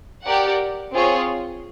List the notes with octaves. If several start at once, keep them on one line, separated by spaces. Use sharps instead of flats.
G4 A#4 D5 F#5
C4 F4 G#4 C#5